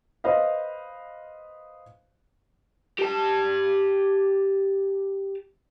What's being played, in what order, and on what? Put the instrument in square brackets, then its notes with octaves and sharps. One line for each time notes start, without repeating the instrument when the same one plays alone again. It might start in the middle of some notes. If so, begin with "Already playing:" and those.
[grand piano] B4 C5 D#5 F5
[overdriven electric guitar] G4 A5